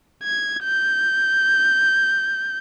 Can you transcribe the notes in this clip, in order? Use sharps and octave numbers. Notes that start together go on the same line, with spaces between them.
G#6
G6